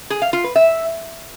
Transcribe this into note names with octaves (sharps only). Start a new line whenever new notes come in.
G#4
F5
F4
B4
E5